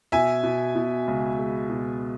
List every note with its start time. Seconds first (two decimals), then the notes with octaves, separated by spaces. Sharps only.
0.12 B2 E5 G#5
0.43 B2
0.76 B2
1.08 C#2
1.39 G#3
1.70 B2